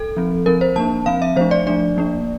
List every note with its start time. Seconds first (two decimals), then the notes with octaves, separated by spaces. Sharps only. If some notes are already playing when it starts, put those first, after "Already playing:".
Already playing: A4
0.17 F3 C4
0.46 F3 C4 A#4
0.61 C5
0.76 F3 A#3 D4 A5
1.06 F3 C4 F5
1.22 E5
1.36 F3 A3 D4 C5
1.51 D5
1.67 F3 A3 D4 D5
1.97 F3 A#3 D4